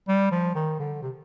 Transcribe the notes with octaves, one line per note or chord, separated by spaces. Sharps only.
G3
F3
D#3
D3
C3